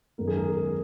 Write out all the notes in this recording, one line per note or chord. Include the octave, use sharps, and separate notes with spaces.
F#2 D#3 G#3 B3 A#4
G#4
A#4
G#4
A#4